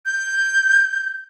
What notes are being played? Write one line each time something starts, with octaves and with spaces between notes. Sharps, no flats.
G6